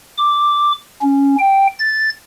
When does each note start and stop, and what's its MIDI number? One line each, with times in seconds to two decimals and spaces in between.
0.18 0.73 86
1.02 1.36 61
1.39 1.67 79
1.79 2.09 93